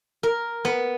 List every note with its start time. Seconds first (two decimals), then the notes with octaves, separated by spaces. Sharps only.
0.23 A#4
0.65 B3